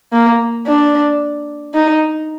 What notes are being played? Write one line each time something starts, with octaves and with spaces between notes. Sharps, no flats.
A#3
D4
D#4